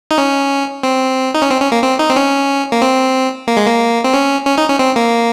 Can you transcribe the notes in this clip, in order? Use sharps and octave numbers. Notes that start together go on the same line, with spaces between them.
D#4
C#4
C4
D#4
C#4
C4
C#4
A#3
C4
D#4
C4
C#4
A#3
C4
A#3
G#3
A#3
C4
C#4
C#4
D#4
C#4
C4
A#3